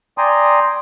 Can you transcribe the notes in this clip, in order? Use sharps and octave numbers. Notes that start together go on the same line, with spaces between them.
D5 G5 G#5 A#5 C6 D#6